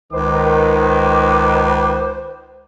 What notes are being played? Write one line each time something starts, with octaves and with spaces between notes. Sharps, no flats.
C#2 D#3 B4 C5 D6